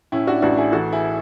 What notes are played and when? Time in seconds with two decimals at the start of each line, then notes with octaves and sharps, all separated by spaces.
0.12 A2 C#4 E4
0.27 D4 F#4
0.42 A1 D4 F#4
0.57 E4 G#4
0.72 E3 F#4 A4
0.92 E4 G#4